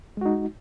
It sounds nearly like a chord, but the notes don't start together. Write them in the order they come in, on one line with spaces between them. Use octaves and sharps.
G#3 F#4 D#4